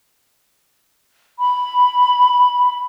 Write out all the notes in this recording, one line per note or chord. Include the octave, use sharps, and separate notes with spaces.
B5